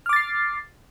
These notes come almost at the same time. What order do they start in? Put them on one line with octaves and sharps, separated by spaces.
F6 D6 A6 C7